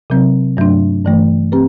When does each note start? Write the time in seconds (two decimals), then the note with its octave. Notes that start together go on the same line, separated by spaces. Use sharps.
0.10 C3 F#3 C4
0.57 G2 F#3 A3 D4
1.05 G2 E3 A3
1.52 C4 G4 B4